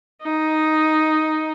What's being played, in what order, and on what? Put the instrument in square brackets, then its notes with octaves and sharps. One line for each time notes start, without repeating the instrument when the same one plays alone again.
[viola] D#4